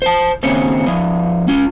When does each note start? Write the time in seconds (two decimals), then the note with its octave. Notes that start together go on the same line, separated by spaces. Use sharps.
0.02 C5 A5
0.43 D#2 C#3 C4 C#4 C#5
0.87 F3 B3
1.48 C#4 F4